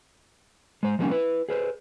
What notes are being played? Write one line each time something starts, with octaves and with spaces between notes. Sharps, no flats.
G#3 C5
F3 G3 A#3 C4 C#4 D#4
E4 B4
G#4 B4 C5